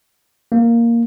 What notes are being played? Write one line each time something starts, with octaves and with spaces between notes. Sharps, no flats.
A#3